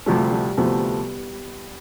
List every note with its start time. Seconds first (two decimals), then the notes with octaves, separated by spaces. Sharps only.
0.06 D2 C3 F3 G3 A3
0.19 G3
0.32 G3
0.57 D2 C3 F3 A3 B3